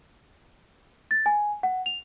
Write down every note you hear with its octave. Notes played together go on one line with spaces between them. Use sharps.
A6
G#5
F#5
F7